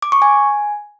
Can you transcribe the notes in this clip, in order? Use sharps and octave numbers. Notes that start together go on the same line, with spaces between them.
D6
C#6
G#5